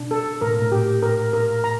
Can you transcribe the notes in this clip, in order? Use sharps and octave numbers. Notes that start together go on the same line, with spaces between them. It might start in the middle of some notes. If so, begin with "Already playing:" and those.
Already playing: B2 D4
A4
A2 A#4
A#2
A2
G4
A#4
A#4
A#5